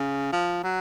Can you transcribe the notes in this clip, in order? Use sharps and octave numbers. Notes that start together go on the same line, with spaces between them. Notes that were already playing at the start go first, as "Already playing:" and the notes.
Already playing: C#3
F3
F#3